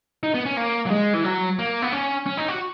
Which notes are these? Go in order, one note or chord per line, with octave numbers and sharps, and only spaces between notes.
D#4
B3
C#4
A#3
F#3
G#3
E3
F#3
A#3
B3
C#4
C#4
D#4
F#4